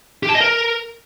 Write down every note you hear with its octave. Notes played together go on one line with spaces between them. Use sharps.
G4
A5
D#5
A#4